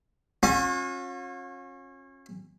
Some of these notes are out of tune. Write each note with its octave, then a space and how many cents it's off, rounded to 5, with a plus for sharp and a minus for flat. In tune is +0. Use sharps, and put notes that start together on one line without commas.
C#4 -30 F4 +45